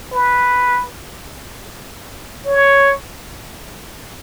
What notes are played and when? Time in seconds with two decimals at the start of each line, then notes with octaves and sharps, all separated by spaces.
0.13 B4
2.46 C#5